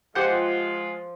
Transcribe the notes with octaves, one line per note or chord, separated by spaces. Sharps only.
F3 G#3 F4 G4 C5 F#5